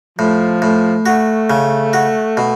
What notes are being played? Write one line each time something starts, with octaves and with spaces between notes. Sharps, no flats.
A2 F3
A2
A3 F#4
C#3
F#4
B2